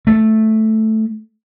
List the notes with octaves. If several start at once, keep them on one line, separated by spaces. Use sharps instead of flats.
A3